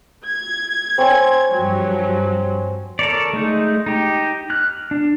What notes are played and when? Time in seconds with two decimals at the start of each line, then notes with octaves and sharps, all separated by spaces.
0.25 G#6
0.98 C4 C#5 G#5
1.52 G2 F3 F#3
2.99 A4 A#4 C#5 D5
3.33 G#3 A3 D#4
3.86 D#4 G4
4.50 F6 F#6
4.91 D4